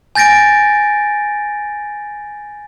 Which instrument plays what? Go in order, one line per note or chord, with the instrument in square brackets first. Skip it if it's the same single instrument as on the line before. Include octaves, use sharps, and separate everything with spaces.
[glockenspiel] G#5 G6 A6 A#6 D7